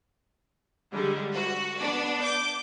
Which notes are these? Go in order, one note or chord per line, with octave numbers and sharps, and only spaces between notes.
D3 G3 G#3
F#4
B3 D4 D5
D6 G6